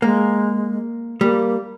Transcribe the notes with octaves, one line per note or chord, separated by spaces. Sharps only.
G#3 A#3
G3 A#3